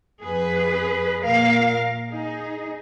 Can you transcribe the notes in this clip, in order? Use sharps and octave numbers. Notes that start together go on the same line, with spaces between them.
F2 G#4 B4
A#2 A#4 F5
D#4 G#4